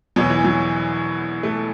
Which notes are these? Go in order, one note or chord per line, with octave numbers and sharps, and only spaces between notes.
E1 E2 B2 F#3
E3
F#3
A3